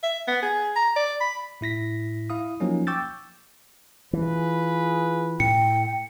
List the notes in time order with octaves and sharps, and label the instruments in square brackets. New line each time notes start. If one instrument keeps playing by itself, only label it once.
[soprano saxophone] E5
B3
G#4
A#5
D5
B5
[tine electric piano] A2 E4 A#6 B6
E4 F5 D#6
F3 F#3 A#3 C#4 D#4
G5 C#6 D6 E6 G6 A6
[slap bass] E3 [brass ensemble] F4 G#4 B4
[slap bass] A2 [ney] G5 [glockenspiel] C#7